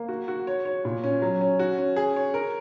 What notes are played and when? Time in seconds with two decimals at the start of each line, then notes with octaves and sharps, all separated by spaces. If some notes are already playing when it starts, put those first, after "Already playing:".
Already playing: A#3
0.09 F#4
0.28 F#4
0.47 C#5
0.65 C#5
0.85 A#2
1.04 C#4
1.22 F#3
1.41 C#4
1.59 F#4
1.78 C#4
1.96 G#4
2.16 C#5
2.34 A#4